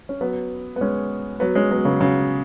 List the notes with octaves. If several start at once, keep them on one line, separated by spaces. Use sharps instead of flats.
C#4
F#3 B3
B3
G#3 C#4
F#3 B3
G#3 C#4
F#3 B3
C#3 F#3
C#3 F#3